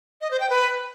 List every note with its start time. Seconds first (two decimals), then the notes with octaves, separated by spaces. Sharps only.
0.21 D#5
0.31 C5
0.40 G5
0.50 B4